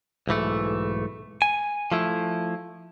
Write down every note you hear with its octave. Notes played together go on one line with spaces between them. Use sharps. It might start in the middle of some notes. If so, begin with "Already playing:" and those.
B1 G#2 E3 A3
G#5
F3 A3 E4